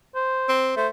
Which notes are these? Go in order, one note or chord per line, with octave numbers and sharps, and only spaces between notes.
C5
C4
A3 C5